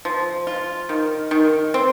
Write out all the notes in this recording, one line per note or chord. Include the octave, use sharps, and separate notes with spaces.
F3
F4
D#3
D#3
C4